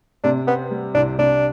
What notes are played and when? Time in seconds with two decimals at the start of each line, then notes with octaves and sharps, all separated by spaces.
0.23 C3 D4
0.47 B3 C4
0.71 G3
0.94 C2 D4
1.18 C3 D4